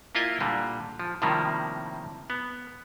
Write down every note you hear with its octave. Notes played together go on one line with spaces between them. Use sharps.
A#3 E4 F4 D#5 G#5
A#2 D3 G3
F3
A2 C3 D#3 F3 G3 A#3
B3